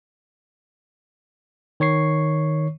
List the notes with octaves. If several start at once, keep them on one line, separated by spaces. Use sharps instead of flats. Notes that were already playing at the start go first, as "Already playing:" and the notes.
D#3 C#5 C#6 C7